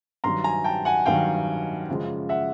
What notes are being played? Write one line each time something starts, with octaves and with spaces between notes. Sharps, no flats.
G2 D#3 F#3 A#5 C6
G#5 A#5
G5 A5
F#5 G#5
G2 D#3 F#3 F5 G5
F#2 C#3 F3 G#3
E5 F#5